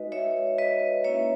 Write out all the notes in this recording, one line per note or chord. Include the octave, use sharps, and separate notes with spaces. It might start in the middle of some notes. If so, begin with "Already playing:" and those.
Already playing: G#3 D#4 F#4 B4 D#5
C#5 E5
B4 D#5
A#3 C#4 E4 C#5 E5